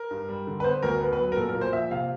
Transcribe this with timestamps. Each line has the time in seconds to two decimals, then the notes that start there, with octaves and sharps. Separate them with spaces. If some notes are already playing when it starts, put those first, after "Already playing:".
Already playing: A#4
0.11 G2
0.29 G3
0.47 D3
0.60 B4
0.64 B3 C5
0.83 D2 A#4
1.01 B3 B4
1.13 B4
1.19 F#3
1.32 A#4
1.37 A#2 A4
1.49 A#4
1.55 A#2
1.61 C5
1.73 F3 E5
1.91 C3 F5